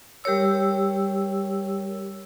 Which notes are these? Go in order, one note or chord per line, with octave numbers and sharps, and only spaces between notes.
G3 G4 A#4 C#5 E6